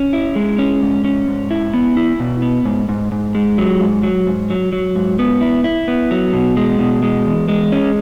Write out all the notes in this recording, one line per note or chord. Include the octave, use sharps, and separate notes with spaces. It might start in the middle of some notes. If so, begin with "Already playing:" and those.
Already playing: C#4
E4
G#3
C#4
G#2
C#4
G#2
E4
B3
E4
B2
B3
G#2
G#2
G#2
G#3
F#3
G#2
F#3
G#2
F#3
F#3
G#2
B3
E4
E4
B3
F#3
B2
G#3
B2
G#3
E2
G#3
C#4